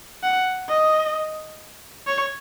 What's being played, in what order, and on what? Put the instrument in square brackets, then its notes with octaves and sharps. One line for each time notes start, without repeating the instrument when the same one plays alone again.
[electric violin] F#5
D#5
C#5